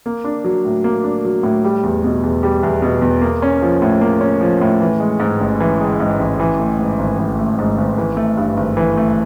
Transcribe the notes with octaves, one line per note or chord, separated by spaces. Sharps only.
A#3
D4
F#3
A2
A#3
D4
F#3
A2
G3
E2
B2
E2
G3
E2
B2
E2
A#3
C#4
F3
A2
A#3
C#4
F3
A2
E3
G#3
G#2
A1
E3
G#3
G#2
A1
E3
A3
G#2
G#1
E3
A3
G#2
G#1
E3
A3
G2
G#1
E3
A3